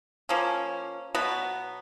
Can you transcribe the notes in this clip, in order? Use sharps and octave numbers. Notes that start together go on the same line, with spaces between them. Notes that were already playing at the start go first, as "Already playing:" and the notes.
F3 A#3 C#4
B2 F#3 B3